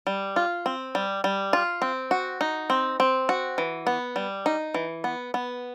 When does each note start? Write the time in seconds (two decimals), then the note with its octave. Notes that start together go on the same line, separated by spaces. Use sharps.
0.07 G3
0.36 F4
0.66 C4
0.95 G3
1.24 G3
1.53 F4
1.82 C4
2.11 F#4
2.41 D#4
2.70 C4
3.00 C4
3.29 F#4
3.58 E3
3.87 B3
4.16 G3
4.46 D#4
4.74 E3
5.04 B3
5.34 B3